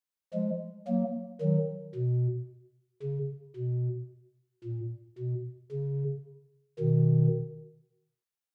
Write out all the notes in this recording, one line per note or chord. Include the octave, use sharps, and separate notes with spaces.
F3 G#3
F#3 A#3
D#3 F#3
B2
C#3
B2
A#2
B2
C#3
B2 D#3